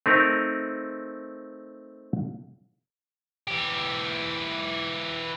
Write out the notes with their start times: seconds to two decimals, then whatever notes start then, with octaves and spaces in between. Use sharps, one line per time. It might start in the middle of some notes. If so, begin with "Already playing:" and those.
0.06 A3 C4 D#4 A#4
3.48 E3 G4